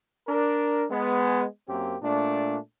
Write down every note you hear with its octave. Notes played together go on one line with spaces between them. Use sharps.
D4 A#4
G#3 B3
F#2 A#3 C4 G4
A#2 A3 D4